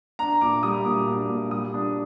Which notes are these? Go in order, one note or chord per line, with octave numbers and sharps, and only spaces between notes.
D4 A#5
A#2 D6
G3 D#6
A#2 D6
D4
A#2
G3 D#6
D4